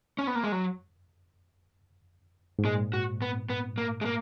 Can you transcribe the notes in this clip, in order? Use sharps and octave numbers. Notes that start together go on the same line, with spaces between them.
C#4
B3
A#3
G#3
F#3
G#2
A#2 G#3
F#4
B3
B3
A#3
G#3
A#3